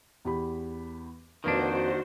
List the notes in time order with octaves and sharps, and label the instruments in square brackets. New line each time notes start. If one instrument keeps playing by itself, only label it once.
[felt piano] E2 G4 B5
[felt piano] F2 B4 [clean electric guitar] D#3 A#3 D4 [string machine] F#4 C5